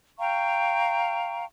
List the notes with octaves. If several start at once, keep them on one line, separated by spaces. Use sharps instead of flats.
F5 G5 A#5 C#6